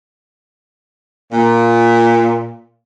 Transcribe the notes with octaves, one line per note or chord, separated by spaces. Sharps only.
A#2